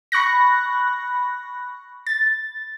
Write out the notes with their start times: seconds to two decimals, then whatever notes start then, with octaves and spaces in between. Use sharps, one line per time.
0.12 B5 C#6 F#6 A#6
2.07 A6